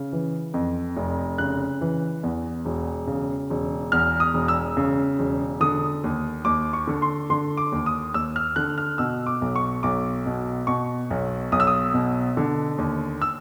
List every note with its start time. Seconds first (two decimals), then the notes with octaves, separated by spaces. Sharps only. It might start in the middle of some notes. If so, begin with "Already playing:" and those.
Already playing: C#3
0.12 E3
0.54 F2
0.97 F1
1.38 C#3 F#6
1.81 E3
2.23 E2
2.65 E1
3.07 C#3
3.50 E1
3.92 E2 F6
4.20 D#6
4.34 E1
4.48 E6
4.77 C#3
5.19 E1
5.60 D3 D#6
6.04 D#2
6.45 D#2 D6
6.73 C#6
6.87 D3
7.02 C6
7.30 D3 C6
7.57 D6
7.72 D#2
7.86 D#6
8.14 D#2 E6
8.36 F6
8.56 D3 F#6
8.78 F6
8.98 B2 E6
9.26 D6
9.41 B1
9.56 C#6
9.83 B1 D6
10.26 B2
10.67 B2 C#6
11.10 B1
11.52 B1 D#6
11.60 E6
11.67 D#6
11.94 B2
12.37 D3
12.78 D#2
13.22 E6